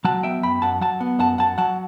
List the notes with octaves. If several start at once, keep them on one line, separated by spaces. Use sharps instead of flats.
F#3 F#5 A5
B3 E5 G5
F#2 G5 B5
F#2 F#5 A5
F#3 F#5 A5
B3
F#2 F#5 A5
F#2 F#5 A5
F#3 F#5 A5